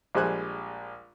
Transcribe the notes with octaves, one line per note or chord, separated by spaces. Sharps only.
A#1 G3 G#3 C5 G#5 F#6